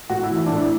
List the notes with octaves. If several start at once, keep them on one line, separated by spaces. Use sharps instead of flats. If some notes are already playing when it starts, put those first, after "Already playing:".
A2 F#4
E4
E3
E4
A2 D4
E4